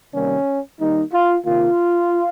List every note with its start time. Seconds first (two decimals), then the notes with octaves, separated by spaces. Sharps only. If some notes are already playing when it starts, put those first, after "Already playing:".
0.13 C3 D#3 G3 A#3 C#4
0.79 D#3 G3 A#3 D#4
1.12 F4
1.45 C3 D#3 A#3 F4